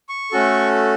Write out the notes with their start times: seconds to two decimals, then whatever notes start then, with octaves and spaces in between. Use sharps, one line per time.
0.09 C#6
0.32 A3 C#4 F#4 A4